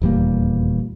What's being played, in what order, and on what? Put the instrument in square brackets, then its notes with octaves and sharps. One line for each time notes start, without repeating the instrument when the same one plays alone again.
[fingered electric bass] D#1 E2 G3 A#3